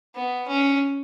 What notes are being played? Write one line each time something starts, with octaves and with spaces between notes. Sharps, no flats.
B3
C#4